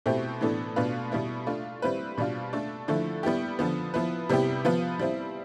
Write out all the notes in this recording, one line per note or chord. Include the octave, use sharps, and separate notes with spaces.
B2 A3 C4 E4 G4
A2 E3 B3 D4 A4
B2 B3 D4 F4 B4
B2 G3 B3 E4
A3 D4 F4
G3 C4 E4 B4
B2 G3 D4 F4
A3 D4 A4
D3 F3 A3 E4
G3 B3 E4 G4
D3 F3 B3
F3 B3 E4 B4
C3 G3 B3 E4 G4
F3 B3 F4 B4
G3 C4 E4